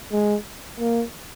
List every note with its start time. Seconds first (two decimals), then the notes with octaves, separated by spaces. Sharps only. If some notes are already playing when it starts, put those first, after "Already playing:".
0.12 G#3
0.80 A#3